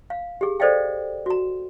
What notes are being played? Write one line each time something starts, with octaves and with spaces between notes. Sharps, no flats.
F5
G4 G#4
A4 C5 D5 D#5 F5 G5
F#4 A#5